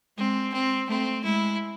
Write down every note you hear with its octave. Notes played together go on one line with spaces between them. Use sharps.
G#3 C4
C4
A3 C4
G#3 E4